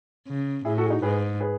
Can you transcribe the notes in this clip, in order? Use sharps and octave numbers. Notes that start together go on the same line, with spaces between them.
C#3
A2 E4 G#4
F#4 A4
G#4
D#4 F#4
G#2 G#4 B4
G#4 B4